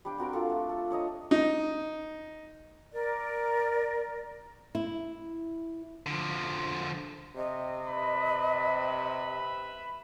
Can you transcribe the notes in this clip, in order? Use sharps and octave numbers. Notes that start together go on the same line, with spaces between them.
G3 D4 G5
C4 F#4 A#4 A#5
D4 F4 A4
A3
A4
D4 C#5 D#5 A#5
D#4
A#4 D5
E4
D3 F3
C3 D#5
B4 E5 B5